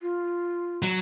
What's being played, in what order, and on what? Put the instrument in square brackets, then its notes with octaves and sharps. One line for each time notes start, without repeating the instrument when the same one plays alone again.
[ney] F4
[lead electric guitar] F#3